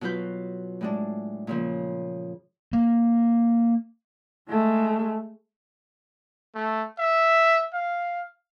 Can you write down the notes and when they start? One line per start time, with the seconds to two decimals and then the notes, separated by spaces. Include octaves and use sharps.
0.01 B2 F#3 F4 B4 G6
0.81 A2 G#3 D4
1.47 A#2 C#3 F3
2.73 A#3
4.49 G#3 A3
6.55 A3
6.99 E5
7.73 F5